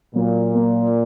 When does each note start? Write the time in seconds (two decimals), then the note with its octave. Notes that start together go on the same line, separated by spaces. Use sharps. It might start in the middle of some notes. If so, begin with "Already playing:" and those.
0.15 A#2 F#3
0.54 A#3